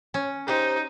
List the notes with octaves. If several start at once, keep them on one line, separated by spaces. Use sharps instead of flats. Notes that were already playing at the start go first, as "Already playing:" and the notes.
C#4
D#4 G4 C5